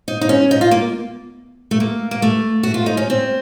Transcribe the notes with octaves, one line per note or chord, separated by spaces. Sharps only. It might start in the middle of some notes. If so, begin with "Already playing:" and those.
D#4
D#4
C#4
D#4
F4
A#3
A3
A#3
A#3
A3
F#4
F4
D#4
C#4
C4